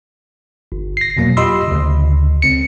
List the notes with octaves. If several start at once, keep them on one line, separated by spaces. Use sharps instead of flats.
G1
A#6 C7
F2 B2 F#3 A#3
F4 G4 D#5 B5 C6 E6
D2 C#3
C#2 C4 C#7